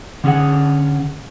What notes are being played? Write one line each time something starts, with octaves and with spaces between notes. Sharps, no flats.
D3 C#4 E4 G#4 F#5